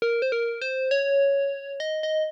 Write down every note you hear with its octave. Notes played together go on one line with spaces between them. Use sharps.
A#4
C5
A#4
C5
C#5
D#5
D#5